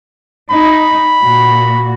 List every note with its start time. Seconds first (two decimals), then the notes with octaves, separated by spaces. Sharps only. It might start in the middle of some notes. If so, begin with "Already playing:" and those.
0.51 D#4 B5
1.22 A#2 F#4